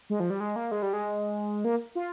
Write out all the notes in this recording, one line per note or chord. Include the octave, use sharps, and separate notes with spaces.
G#3
F3
G3
G#3
A#3
G#3
G3
G#3
A#3
F4